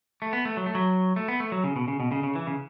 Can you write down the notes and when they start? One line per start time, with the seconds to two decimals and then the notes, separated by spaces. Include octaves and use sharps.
0.22 A3
0.33 B3
0.45 A3
0.57 F#3
0.66 A3
0.75 F#3
1.16 A3
1.28 B3
1.40 A3
1.52 F#3
1.64 C#3
1.76 B2
1.88 C#3
2.00 B2
2.12 C#3
2.23 C#3
2.35 E3
2.47 C#3